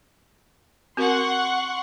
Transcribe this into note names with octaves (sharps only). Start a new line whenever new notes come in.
C4 F#4 A#4 F#5 C6 C#6